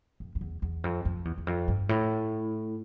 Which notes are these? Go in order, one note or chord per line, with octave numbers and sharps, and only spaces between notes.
F2
F2
E2
E2
F2
F2
E2
E2
F2
G2
A2